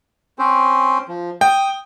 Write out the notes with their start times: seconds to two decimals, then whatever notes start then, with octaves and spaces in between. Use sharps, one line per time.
0.39 C4 C#4 C5
1.08 F3
1.41 G5 D#6